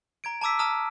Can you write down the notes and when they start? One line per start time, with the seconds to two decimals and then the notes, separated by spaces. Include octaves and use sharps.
0.24 A#5 G#6 D7
0.41 A5 A#5 D6 E6 B6
0.59 A5 A#5 D#6 F6